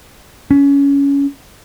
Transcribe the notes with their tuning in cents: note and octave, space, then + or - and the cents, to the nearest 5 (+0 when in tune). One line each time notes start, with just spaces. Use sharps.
C#4 +20